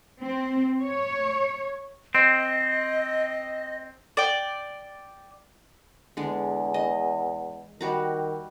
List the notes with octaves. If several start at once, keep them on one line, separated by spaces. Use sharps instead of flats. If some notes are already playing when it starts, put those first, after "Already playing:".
C4
C#5
C4 D#5
D5 G5
E2 D3 G#3
D#5
D#3 G3 F#4 A#5